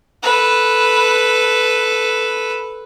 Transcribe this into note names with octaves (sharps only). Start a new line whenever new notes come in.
A4 B4